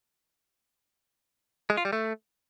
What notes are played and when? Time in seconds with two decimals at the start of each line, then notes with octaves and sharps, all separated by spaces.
1.70 G#3
1.77 F4
1.85 G3
1.93 A3